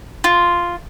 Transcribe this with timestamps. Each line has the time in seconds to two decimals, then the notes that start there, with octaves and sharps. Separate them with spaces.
0.24 F4